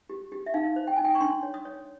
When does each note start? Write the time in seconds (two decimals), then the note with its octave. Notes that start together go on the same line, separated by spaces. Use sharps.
0.10 G4
0.32 G4
0.46 E5
0.54 D#4 F5
0.76 C5
0.87 G5
0.96 D#4 G#5
1.05 G5
1.15 C#6
1.21 D4 C6
1.43 C#5
1.54 D#6
1.65 C#5